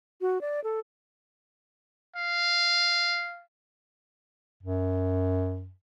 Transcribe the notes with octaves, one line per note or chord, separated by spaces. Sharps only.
F#4
D5
A4
F5
F#2